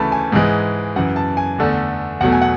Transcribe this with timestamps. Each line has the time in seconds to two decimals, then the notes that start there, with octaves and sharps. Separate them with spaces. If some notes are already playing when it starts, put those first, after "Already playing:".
Already playing: D2 C#3 E3 A3 A5 B5
0.12 G#5
0.32 G#2 E3 G#3
0.96 F#2 C#3 E3 F#5
1.16 A5
1.37 G#5
1.58 E2 D3 A3
2.21 E2 B2 F#3 A3 F#5
2.32 G#5
2.42 F#5